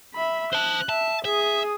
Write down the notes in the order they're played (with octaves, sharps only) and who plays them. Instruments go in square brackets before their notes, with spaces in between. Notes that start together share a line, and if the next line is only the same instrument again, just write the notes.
[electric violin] E5 B5
[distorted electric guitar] C5 A5 [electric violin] F#6
[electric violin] E5 [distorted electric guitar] A5
[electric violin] G#4 D#6 [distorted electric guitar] E5